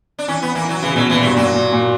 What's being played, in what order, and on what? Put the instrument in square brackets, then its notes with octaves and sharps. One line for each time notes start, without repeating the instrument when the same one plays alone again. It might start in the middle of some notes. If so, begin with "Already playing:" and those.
[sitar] D4
[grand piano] E3 [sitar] C#4
[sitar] B3
[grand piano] E3 [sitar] A#3
[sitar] F#3
[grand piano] C#3 [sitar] E3
[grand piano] B2 [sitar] F#3
[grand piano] A#2 [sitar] E3
[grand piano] G2 [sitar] F#3
[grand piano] A#2 [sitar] F#3
[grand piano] A#2
A#2